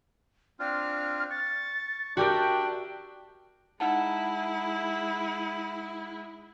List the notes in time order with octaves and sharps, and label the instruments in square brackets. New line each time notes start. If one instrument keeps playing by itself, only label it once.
[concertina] C4 D4 F4 [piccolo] F6
[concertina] C#6 [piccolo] A6
[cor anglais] D4 [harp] F#4 G4 A#4 [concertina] E5 [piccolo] G5
[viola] G#3 E4 [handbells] D#4 F#5 A5